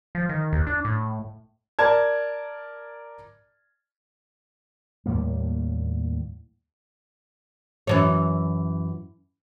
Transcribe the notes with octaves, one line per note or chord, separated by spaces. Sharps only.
F3
D#3
D#2
D4
A2
A#4 D5 A5 G#6
D#2 A2 G3 A#3
F#2 E3 C#5